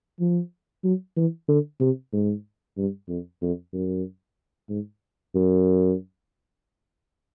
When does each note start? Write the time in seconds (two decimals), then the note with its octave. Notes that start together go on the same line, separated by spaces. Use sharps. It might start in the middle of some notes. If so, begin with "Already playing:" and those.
0.20 F3
0.84 F#3
1.17 E3
1.48 D3
1.80 C3
2.13 G#2
2.77 G2
3.09 F2
3.42 F2
3.73 F#2
4.69 G#2
5.35 F#2